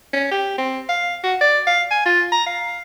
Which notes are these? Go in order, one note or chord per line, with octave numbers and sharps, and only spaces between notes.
C#4
G4
C4
F5
F#4
D5
F5
G#5
F4
A#5
F5